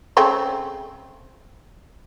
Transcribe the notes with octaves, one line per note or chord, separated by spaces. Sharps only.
C#3 A3 C4